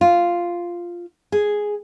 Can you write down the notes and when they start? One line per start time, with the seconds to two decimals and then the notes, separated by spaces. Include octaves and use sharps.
0.01 F4
1.32 G#4